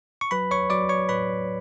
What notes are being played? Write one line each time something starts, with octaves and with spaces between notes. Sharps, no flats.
C#6
F#3 B4 B5
C#5 C#6
F#3 D5 D6
C#5 C#6
A2 B4 B5